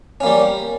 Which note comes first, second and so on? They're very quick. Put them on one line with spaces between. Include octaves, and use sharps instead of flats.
C#4 A#3 G3